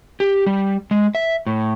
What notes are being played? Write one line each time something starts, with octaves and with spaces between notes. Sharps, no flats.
G4
G3
G#3
E5
A2